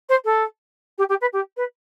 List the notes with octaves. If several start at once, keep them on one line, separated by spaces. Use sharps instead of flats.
C5
A4
G4
G4
B4
G4
B4